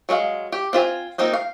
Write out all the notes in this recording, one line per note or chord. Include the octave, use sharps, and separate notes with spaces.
F#3 G#3 A#4 F5
G4
C4 F4 E5 G#5
A#3 C4 D#4 F4
F5